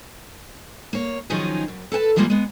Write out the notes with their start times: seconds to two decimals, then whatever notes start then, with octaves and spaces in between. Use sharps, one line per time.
0.93 A#3 C#5
1.30 D#3 F3 F#3 C#4 D#4 G#4
1.68 F#2
1.92 A4 B4 G5 A5
2.16 E3 F3 G3 G#3 A#3 F4
2.30 G#3 B3